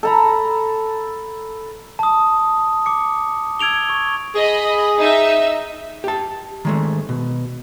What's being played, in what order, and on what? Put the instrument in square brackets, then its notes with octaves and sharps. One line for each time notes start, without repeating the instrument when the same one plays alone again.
[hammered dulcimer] A4 A#5 B5
[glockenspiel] A5 D#6
D6 C#7
E6 G#6 D7 F7 G7
C#6
[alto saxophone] G#4 [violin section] D#5 B5
[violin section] D#4 E5
[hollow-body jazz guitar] G4 A5
D#3 G#3 A3
B2